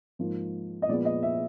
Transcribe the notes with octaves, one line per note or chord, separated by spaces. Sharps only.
G#2 F3 A#3
D#5
A#2 F3 G#3 B3 D5
D#5
E5